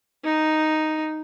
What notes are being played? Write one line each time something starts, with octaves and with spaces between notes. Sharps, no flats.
D#4